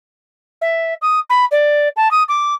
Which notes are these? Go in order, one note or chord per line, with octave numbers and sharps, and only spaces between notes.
E5
D#6
B5
D5
A5
D#6
D6